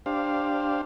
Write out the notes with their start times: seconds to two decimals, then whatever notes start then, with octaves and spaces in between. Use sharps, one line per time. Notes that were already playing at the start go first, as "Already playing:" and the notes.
0.06 D4 G4 C5 F5